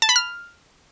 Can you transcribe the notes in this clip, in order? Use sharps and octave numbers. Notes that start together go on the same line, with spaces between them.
A5
B5
F6